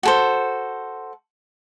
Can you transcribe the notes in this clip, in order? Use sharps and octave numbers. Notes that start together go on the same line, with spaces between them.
F#4 A4 C5